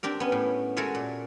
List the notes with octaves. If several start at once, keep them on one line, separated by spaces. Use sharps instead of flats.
C4 D4 G4 A#4
B3 C#4
A2
G#3 F#4 A4 A#4 C#5 E5
A#2